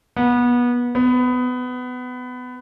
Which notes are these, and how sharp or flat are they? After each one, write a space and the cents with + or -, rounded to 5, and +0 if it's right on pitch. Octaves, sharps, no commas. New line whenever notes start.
B3 -25
B3 +20